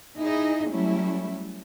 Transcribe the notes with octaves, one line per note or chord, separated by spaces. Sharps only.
D#4 E4 G#4 D#5
F#3 G3 A3 C#4 E4